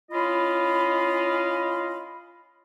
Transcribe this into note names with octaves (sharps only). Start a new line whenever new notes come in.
C#4 E4 F4 D#5 F5 B5